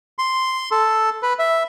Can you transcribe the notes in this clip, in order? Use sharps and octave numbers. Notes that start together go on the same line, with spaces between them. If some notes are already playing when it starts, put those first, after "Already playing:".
C6
A4
B4
E5